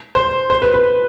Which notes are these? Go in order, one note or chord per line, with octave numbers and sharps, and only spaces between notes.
C5
C5
B4
B4